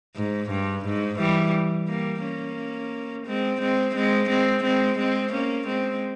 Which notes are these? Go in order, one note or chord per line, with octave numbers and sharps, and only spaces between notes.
G#2
G2
G#2
E3 G3
G3 A#3
A#3 C#4
G#3 C4
G#3 C4
G#3 C4
G#3 C4
G#3 C4
G#3 C4
A#3 C#4
G#3 C4